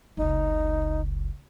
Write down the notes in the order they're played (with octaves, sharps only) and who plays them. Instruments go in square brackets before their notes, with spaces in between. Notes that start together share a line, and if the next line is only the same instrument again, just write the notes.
[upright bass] F#1 C#2 [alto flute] D#4